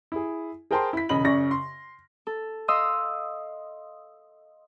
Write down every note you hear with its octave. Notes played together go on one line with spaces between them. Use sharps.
E4 G#4
G#4 A#4 C5 G5 A5 C6
E4 B6
E1 C#3 D#5 B5 F#7
F#2 C#3 D5 C#6 A#6
C6
A4
D#5 F5 C6 D#6 E6